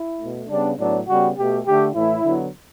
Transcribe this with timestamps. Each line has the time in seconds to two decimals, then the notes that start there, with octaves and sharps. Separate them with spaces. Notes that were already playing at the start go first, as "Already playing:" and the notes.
Already playing: E4
0.19 B2 A3
0.49 C#3 G3 B3 D4
0.78 A2 F#3 B3 D4
1.08 C#3 G3 B3 F#4
1.37 B2 A3 G4
1.65 D3 A3 G4
1.95 A2 E3 A3 E4
2.24 D3 F#3 B3